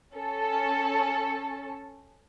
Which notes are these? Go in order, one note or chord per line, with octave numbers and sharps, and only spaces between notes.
C#4 A4